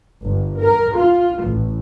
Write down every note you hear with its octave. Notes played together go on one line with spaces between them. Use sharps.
G1
A#4
F4
A1